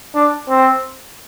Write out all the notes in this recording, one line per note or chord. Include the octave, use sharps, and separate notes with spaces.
D4
C4